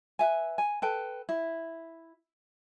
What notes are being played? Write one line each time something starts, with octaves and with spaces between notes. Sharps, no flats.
B4 E5 G#5
G#5
A4 B4 G5
E4